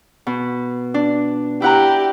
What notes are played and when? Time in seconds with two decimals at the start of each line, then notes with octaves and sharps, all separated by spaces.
0.27 B2
0.94 D4
1.62 E4 G4 F#5 A#5